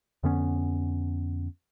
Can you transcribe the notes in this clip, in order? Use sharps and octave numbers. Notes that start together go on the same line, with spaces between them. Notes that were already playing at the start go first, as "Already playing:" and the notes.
F2 D3 B3 C#4